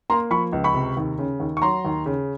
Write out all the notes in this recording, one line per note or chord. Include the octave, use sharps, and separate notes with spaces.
A#3 A#5 C6
F3 B5 C#6
C#2
B5 C#6
C3
D#2
C#3
D#2
C#6
F#3 A#5 C6
D#2
C#3